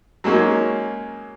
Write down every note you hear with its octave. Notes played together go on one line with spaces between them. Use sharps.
F#3 G#3 A#3 C#4 D#4